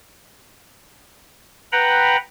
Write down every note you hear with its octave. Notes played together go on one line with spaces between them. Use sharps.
B4 F#5 G5 A#5 B5